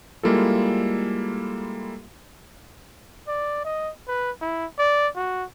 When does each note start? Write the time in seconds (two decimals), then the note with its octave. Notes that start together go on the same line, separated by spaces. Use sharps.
0.23 G3 G#3 A#3 E4 F4 A4
3.28 D5
3.65 D#5
4.08 B4
4.41 E4
4.79 D5
5.16 F#4